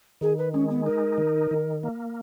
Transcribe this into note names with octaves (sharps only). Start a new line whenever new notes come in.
D#3 G#4
B4
G#3 C#4
B3
D#4 A#4
D#3
D#3
A#3